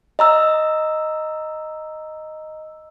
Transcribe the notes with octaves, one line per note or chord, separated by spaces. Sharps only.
D#5 A#5 E6